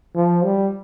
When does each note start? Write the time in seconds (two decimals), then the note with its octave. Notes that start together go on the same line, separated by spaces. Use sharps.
0.16 F3
0.44 G3